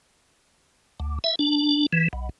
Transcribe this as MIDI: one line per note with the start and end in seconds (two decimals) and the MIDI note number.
1.00 1.19 38
1.24 1.35 76
1.39 1.86 62
1.93 2.08 52
2.13 2.29 35